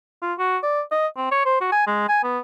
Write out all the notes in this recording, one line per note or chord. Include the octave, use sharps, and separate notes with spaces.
F4
F#4
D5
D#5
C4
C#5
C5
F#4
G#5
G#3
G#5
B3